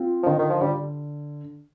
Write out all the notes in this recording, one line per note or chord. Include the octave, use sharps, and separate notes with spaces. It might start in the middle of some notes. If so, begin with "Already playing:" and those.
Already playing: C4 F4
F3
D3 D#3
D#3
F3
D3 G3